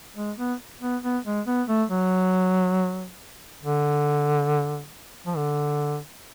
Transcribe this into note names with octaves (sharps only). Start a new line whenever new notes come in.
G#3
B3
B3
B3
G#3
B3
A3
F#3
D3
F3
D3